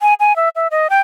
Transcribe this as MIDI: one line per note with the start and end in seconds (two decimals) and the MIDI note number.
0.01 0.14 80
0.20 0.36 80
0.36 0.49 76
0.56 0.68 76
0.71 0.88 75
0.90 1.01 79